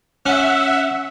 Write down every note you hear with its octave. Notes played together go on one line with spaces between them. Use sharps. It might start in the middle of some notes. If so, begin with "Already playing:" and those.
C#4 E5 F#5